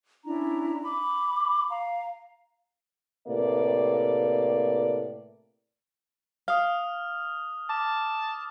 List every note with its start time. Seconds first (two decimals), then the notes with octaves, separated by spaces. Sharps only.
0.25 C#4 D4 E4 A#5
0.83 B5 D6
1.70 F5 A#5
3.27 A2 C3 A#3 B4 D5
6.48 F5 D#6 F6
7.69 A5 D6